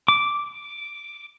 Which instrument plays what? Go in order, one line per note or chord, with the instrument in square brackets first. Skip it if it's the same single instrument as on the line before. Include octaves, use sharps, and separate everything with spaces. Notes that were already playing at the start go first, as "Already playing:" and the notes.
[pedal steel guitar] D6